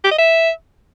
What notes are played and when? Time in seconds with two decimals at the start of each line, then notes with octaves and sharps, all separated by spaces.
0.04 G4
0.11 D#5
0.18 E5